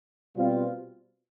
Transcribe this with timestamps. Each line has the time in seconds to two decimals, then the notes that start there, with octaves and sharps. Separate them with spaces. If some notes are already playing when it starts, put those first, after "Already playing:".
0.36 B2 G3 C4 F4